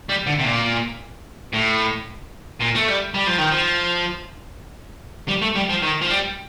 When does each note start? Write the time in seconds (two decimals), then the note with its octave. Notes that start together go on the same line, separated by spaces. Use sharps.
0.09 G3
0.27 D3
0.39 C3
0.44 A#2
1.53 A2
2.60 A#2
2.75 A3
2.88 G3
3.14 G3
3.27 F3
3.39 D#3
3.51 F3
5.29 G3
5.42 A3
5.56 G3
5.70 F3
5.83 D#3
6.02 F3
6.10 G3